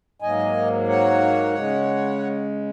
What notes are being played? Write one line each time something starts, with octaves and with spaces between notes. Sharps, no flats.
G#2 F#3 A#3 D#5 G#5
C#5 F#5
C#3 G#3